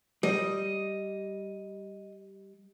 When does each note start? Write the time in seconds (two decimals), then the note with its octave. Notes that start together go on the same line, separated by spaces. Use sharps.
0.23 G3 D#5